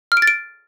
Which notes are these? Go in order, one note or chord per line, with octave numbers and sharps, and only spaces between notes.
F6
D7
A6
D7